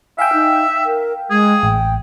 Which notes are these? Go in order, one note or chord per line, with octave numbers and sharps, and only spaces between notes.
E5 F5 G5 G#5
D#4
A#4
G#3 G#4
A1 G5